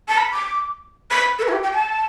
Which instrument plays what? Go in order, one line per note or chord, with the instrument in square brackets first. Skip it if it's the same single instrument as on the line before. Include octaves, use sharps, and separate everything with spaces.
[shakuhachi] A5
B5
D6
B5
A4
B4
E4
G4
G5
A5